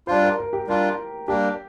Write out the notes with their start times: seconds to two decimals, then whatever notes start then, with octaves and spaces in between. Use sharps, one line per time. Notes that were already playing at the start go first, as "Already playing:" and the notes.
0.07 G3 D4 F4 C5
0.23 A#4
0.38 A#4
0.53 G4
0.67 G3 D4 F4 A#4
1.28 G3 A#3 D4 G4